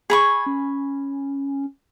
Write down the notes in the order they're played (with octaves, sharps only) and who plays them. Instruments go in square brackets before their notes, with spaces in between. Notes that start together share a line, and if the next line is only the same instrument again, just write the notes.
[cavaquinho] G#4 B5 C#6 [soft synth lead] G#6
[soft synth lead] C#4